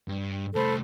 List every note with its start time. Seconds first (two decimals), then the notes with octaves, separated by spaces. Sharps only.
0.08 G2
0.55 C2 A3 A4 C5 B5